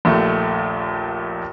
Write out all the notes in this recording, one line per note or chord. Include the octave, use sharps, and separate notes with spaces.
A#1 D#2 A3